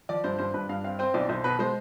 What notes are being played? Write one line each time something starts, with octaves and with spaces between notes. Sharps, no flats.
F3 D5
G2 C5
G2 C5
G2 B4
G2 F5
C4 F5
C4 C5
B1 D5
B1 C5
B2 B4
G#3 C5